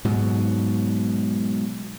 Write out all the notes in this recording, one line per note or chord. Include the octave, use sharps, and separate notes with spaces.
G#2 B2 F#3